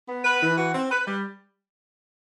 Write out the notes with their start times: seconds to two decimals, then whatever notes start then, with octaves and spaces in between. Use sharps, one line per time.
0.09 B3
0.25 B4
0.42 E3
0.58 F#4
0.75 C4
0.92 B4
1.07 G3